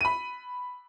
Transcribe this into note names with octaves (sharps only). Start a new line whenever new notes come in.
B5 D#7